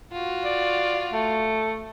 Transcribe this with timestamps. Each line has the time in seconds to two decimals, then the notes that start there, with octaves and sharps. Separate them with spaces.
0.12 F4 F#4
0.44 D5
1.13 A3